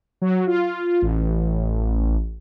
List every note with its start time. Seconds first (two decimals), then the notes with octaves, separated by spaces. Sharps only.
0.22 F#3
0.47 F4
1.02 A1